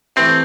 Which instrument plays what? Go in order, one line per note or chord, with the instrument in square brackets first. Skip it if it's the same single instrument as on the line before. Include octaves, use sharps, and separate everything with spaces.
[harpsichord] C3 E3 A3 [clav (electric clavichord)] C4